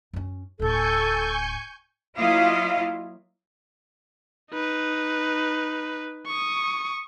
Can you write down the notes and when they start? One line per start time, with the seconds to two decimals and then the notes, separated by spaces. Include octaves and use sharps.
0.13 F#2 C#4
0.59 D1 A2 A4 G#5 C#6 G6
2.15 F#3 A#3 E4 F4 D#5 F5
4.52 D#4 B4
6.27 C#6 D#6